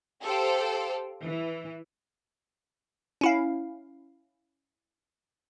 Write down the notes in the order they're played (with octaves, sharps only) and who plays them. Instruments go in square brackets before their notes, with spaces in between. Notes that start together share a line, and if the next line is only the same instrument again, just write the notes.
[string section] G4 A4 C5 F5 G5
E3
[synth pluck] C#4 E4 F5